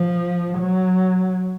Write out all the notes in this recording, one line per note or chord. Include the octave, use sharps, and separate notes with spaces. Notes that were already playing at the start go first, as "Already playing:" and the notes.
Already playing: F3
F#3